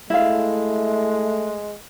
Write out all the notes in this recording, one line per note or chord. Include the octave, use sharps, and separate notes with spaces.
G#3 A3 E4 F5